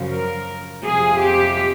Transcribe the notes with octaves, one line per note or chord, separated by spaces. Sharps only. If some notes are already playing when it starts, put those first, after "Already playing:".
Already playing: F#2 C#3 F3
A#4
F2 C3 F3 G#4
G4